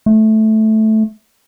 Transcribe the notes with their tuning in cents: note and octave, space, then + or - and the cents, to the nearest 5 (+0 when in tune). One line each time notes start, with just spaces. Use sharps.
A3 -10